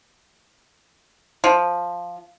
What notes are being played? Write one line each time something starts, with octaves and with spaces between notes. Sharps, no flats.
F3